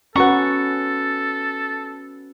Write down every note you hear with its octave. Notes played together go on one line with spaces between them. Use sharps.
C#4 F#4 A4 B4 F#5 A#5 C#6